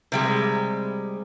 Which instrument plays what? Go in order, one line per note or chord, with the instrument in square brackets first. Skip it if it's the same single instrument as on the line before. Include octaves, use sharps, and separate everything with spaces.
[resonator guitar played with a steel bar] C3 G3 G#3